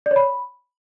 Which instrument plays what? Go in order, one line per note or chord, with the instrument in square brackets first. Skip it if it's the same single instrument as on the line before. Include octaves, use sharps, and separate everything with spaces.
[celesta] D5
C#5
B5